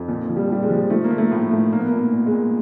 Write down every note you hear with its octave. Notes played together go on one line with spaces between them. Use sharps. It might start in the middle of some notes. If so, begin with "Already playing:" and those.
Already playing: F2
A#2 F3
F3
G3
A#2 G3
G#3
F3
F3 A3
A#3
F3
A3
A2
A2
A#2 A#3
B3
A#3
A#2
A#3
A#2
G#3
A#2